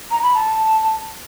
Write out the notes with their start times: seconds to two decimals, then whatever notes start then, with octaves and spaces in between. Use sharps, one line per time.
0.11 A#5
0.23 B5
0.34 A5